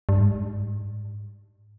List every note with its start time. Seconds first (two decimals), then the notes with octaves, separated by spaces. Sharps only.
0.09 G2
0.20 G#2